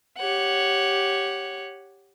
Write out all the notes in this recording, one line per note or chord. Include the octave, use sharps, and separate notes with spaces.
G4 C#5 F#5